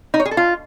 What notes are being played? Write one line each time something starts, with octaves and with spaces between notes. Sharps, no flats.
D#4
C#5
G#4
A4
F4